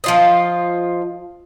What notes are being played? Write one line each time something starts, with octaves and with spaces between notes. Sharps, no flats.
F3 F4 D#5